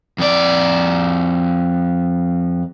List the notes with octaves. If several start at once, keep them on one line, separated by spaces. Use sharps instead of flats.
F2 D5